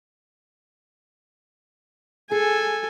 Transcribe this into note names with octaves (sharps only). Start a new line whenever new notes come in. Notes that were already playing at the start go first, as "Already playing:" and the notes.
G#4 A4 G#5